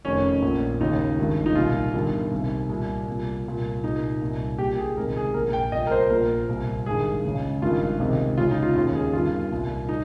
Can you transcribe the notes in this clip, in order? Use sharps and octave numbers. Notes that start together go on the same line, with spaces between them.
F1 F2 D#3 C#4
A#1 A#2
D#2 C#3 D#4
G#1 G2 D#3
D#4
C2 A#2 F4
G1 G2 D#3
C2 C3 D#3
C2 A#2
C2 A#2
C2 A#2
C2 A#2 D#4
C2 A#2
A#1 A#2 G4
G#4
C#2 C3 D#3 A#4
G#4
A#1 A#2 A#4
G5
C2 A#2 D#5
A#4
C5
A#1 A#2 A#4
C2 A#2
G#1 G2 D#3 G#4
C#2 C#3
G#1 G2 D#3 F4
C#2 C3 D#3
C#2 C#3 F4
D#4
F4
D#2 C#3 F4
G#4
G1 G2 D#3 F4
C2 A#2
D#4